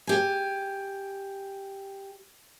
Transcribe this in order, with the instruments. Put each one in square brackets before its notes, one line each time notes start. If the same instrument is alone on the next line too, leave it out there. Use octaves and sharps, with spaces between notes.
[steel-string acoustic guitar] G4 G#5